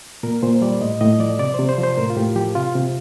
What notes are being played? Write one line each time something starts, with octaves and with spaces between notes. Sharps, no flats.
A#2 A#4
A#2 C5
G3 D5
A2 D#5
A2 D#5
F3 D5
C3 D5
C3 C5
C5
F3
C5
A2 A#4
F4
A2 G4
F3 G4
C3 F4
C3